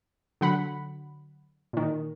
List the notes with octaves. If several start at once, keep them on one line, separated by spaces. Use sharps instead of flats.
D3 F#3 F#5 B5
A#2 D#3